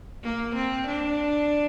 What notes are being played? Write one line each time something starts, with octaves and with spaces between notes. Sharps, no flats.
A#3
C4
D4